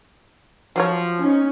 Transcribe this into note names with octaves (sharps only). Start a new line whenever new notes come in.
F3 F#3 F#4 C#5
C#4 D#4